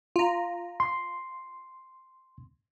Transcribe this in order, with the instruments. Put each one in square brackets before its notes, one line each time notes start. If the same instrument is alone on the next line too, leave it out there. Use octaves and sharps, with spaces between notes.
[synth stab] F4 A#5
[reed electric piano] C6